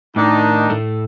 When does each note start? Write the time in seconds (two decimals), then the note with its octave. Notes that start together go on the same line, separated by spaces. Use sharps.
0.16 A2 D#3 D4 D#4
0.70 A2 A3